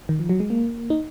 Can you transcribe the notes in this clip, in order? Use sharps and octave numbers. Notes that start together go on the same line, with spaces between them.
D#3
F3
F#3
G#3
A#3
D#4